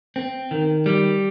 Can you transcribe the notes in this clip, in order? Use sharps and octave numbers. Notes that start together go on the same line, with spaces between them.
C4
D#3
G3